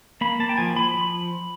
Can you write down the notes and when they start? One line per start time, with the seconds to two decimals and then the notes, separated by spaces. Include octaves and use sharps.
0.21 A#3 B5
0.40 A#3 A5
0.49 G5
0.57 F3 G#5
0.76 F3 B5
0.94 F3